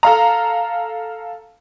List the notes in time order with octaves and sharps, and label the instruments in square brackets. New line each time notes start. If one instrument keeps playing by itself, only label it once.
[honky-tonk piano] A4 F5 A#5